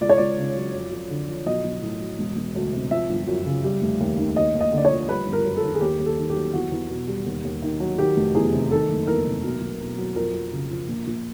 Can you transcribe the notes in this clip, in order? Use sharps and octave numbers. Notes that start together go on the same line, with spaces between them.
C#2 D5
C#5
C#2 D5
C#3
F#3
F2
F2
D3
F3
B1 D#5
B1
A2
F#3
E1
E1
D2
C3
F3 E5
G1
F#2
C#3
G3
F1
D#2
D#3
D#2 D#5
D#2
D#5
D3 D5
C#5
F3
G3 B4
G1
A#4
F#2
A4
D#3
G#4
D#2 G4
D#2
A4
D#3
G4
F#3
E2 F#4
E2
B2
G3
D#2
D#2
D#3
F#3
D#3 G4
F1
E2 G#4
C3
D#3 A4
F#1
E2 A#4
C3
B1
B1
B2
F#3
F2 A#4
F2
C#3
F3
A#1
A#1